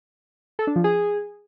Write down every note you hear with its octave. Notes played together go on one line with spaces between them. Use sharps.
A4
D4
F3
G#4